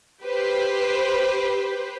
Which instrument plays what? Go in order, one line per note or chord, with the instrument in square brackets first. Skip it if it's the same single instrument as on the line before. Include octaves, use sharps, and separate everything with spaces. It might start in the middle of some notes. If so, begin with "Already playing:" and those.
[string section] G4 B4 C5